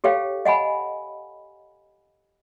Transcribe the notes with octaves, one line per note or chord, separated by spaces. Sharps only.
G4 A4 C#5 F5 G5
D#5 F#5 G#5 B5